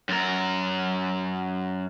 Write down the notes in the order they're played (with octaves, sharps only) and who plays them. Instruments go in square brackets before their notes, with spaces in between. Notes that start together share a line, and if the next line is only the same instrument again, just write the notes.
[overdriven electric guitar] F#2 A#4